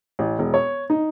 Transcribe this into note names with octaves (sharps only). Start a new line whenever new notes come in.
A1
E1
C#5
D#4